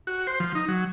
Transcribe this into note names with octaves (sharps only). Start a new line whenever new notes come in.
F#4
C5
F3
D#4
F#3